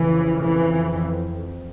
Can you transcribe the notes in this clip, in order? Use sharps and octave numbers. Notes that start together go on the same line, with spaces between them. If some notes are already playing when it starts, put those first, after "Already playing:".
Already playing: F2 C#3 E3
E3